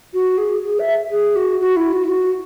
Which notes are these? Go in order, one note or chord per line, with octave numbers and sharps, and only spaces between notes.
F#4
G#4
G#4
E5
G#4
F#4
F#4
E4
F#4
E4
F#4